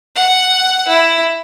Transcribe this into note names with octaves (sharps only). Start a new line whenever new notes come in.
F#5
E4